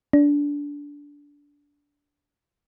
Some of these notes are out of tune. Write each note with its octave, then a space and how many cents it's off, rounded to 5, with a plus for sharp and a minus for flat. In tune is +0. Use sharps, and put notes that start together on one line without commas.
D4 -20